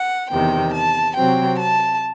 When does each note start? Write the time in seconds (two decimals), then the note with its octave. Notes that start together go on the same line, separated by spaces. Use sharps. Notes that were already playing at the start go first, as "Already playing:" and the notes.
Already playing: F#5
0.30 E2 C3 D#3 G5
0.73 A5
1.16 C3 F#3 C4 G5
1.59 A5